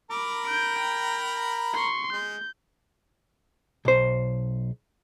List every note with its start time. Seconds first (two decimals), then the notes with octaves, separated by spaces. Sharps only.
0.11 A#4 A#5 B5 D6
0.46 G6 D7
0.79 G5
1.73 C6 C#6
2.13 G#3 G6
3.85 B1 C5